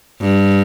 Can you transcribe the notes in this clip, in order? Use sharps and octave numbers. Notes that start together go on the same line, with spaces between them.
G2